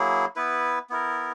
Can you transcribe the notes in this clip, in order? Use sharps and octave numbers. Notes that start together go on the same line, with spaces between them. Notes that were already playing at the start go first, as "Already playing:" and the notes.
Already playing: F#3 A#3 E4 G#4
B3 E4 B4
B3 E4 A#4